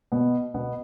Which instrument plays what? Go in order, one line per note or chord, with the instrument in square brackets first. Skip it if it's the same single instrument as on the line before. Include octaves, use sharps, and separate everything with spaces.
[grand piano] B2 B3
B2 B3